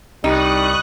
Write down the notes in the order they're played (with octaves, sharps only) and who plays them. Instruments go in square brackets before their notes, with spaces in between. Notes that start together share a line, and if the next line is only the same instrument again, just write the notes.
[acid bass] C2 [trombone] G3 [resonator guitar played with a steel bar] D#4 [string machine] C#6 D#6 F#6